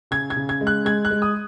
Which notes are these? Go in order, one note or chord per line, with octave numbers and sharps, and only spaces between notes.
C#3 G#6
G#6
C#3
G#6
G#3
F#6
G#3 G#6
F#6
G#3
D#6